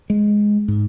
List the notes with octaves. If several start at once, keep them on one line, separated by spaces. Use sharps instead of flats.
G#3
G#2